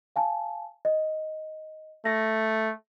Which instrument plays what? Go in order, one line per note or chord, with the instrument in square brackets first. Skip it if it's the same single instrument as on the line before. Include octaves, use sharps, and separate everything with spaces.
[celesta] F5 G#5 A5
D#5
[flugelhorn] A3 [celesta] A#6